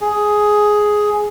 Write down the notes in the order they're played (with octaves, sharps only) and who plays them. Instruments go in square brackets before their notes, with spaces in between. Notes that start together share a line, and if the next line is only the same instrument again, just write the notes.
[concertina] G#4